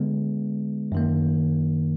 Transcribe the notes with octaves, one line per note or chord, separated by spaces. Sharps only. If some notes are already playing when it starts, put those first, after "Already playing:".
Already playing: D3 G#3 B3
F#2 D#3 A#3